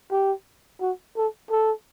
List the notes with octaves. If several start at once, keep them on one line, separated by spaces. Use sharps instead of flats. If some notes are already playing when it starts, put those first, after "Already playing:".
G4
F#4
A4
A4